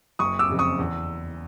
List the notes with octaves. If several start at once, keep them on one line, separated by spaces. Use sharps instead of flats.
F#1 C#6 D#6
D6 E6
F2 C#3
C#6 D#6
E2